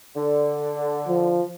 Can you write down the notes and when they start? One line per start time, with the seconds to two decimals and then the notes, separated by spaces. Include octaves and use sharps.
0.16 D3
1.08 F3